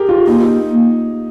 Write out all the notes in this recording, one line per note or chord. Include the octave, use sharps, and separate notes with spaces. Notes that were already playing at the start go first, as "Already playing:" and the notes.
Already playing: G4 G#4 A#4
F4
A#3 D#4